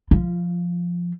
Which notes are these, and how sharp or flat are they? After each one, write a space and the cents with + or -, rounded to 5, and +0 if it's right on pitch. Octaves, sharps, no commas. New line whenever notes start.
F3 +0 F4 -25